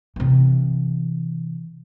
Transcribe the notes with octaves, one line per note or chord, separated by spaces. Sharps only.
C3 E3